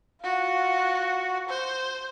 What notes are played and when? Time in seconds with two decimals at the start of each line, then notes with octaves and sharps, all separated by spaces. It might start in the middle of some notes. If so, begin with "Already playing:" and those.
0.22 F4 F#4
1.49 C5